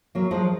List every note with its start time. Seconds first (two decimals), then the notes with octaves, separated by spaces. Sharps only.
0.15 F#3 A#3
0.31 F3 G#3